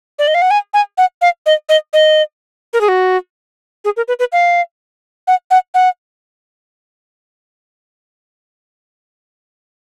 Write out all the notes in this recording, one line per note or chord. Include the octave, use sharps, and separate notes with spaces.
D5
D#5
F5
F#5
G#5
G#5
F#5
F5
D#5
D#5
D#5
A#4
G#4
F#4
G#4
A#4
B4
B4
F5
F#5
F#5
F#5